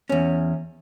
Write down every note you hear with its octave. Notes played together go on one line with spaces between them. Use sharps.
E2 C#4